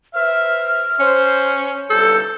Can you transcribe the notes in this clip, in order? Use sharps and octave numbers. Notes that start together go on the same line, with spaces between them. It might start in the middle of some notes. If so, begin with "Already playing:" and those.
B4 C5 E5 F6
C#4 C5
G1 C2 G2 A4 G6